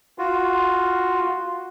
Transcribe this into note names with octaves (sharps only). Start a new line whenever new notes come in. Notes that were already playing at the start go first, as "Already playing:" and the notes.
F4 F#4